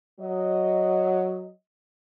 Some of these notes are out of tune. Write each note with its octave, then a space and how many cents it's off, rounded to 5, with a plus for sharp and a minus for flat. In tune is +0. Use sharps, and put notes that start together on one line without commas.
F#3 +0 D#5 +0